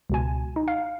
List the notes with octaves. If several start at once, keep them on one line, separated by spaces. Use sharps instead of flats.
C#2 B2 G#5
D#4
F5